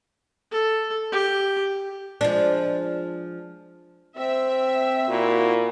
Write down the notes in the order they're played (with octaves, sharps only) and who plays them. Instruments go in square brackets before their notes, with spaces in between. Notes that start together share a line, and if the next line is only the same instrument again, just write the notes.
[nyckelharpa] A4
G4
[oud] F3 G#3 D4
[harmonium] C4 [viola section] E5
[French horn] A#2 [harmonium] E4 F#4